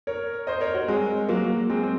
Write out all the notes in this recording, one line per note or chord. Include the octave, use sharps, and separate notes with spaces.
A#4 C#5
C5 D#5
A#4 C#5
F#4 A#4
G#3 C4
F#3 A#3
G#3 C4
C4